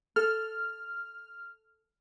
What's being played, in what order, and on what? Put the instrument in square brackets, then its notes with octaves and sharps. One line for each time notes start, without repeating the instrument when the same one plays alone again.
[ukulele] A4 [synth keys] F6